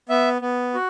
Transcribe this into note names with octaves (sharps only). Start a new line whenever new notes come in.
B3 E5
B3
F#4